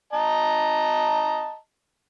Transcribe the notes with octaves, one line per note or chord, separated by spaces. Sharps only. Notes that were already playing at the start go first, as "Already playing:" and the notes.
D#5 A5 A#5